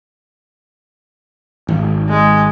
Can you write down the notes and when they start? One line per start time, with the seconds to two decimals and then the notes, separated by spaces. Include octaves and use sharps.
1.68 G#1
2.09 G#3